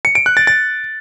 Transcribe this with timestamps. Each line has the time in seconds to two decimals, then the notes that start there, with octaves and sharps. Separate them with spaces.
0.05 C#7
0.15 D7
0.26 F#6
0.37 A6
0.47 A6